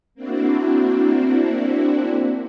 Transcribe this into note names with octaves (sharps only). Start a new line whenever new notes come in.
A#3 C4 D4 E4 F#4